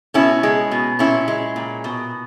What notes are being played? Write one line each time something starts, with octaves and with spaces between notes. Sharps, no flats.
B2 C#4 E4
G#3
B2
A#2 C#4 E4
G#3
A#2
B2